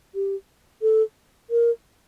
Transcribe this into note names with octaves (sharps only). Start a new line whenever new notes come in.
G4
A4
A#4